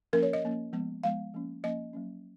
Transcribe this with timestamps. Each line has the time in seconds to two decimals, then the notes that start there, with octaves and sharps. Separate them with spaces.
0.13 F3 A#3 C#4 A#4
0.23 C#5
0.33 D#5
0.44 F3 A#3 C#4
0.73 F3 G#3 B3
1.03 F3 G#3 B3 F5
1.34 F3 A#3 C#4
1.63 F3 A#3 C#4 D#5
1.93 F#3 A#3 C#4